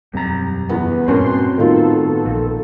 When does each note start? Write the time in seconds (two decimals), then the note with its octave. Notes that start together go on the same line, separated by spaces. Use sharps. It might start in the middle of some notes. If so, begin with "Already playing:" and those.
0.13 E1 C2 F#2 C4 A#5
0.69 E2 B3
1.08 G2 A#2 C4 C#4 F#4 A#4 C6
1.58 A2 D#3 B3 F4 A4
2.26 A#1 A#2